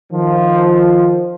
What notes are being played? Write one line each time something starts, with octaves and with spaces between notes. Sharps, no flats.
D#3 F3